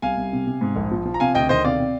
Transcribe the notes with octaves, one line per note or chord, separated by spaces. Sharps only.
C2 F5 G#5
C2
C3
C3
G#2
A#1
F3
F3
A#5
C3 F5 G#5
D2 D#5 G5
D#3 C5 D#5
C3 D5 F5
C3